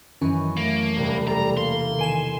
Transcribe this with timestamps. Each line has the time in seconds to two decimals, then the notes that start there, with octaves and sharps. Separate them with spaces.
0.21 F#2 D#3 E3 C#4 C#6
0.57 A3 A#3
0.96 E1 C3 G3
1.27 G3 A4 A#5
1.57 A#3 C6
1.99 D#3 G#5 E7